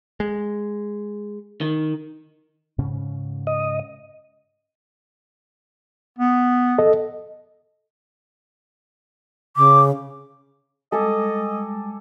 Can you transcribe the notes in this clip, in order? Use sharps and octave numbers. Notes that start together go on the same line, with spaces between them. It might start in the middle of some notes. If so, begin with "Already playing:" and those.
G#3
D#3
G#2 C#3 C#4
D#5
B3
A4 D#5
C#3 D6
G3 G#3 A4 D#5 G#5 D6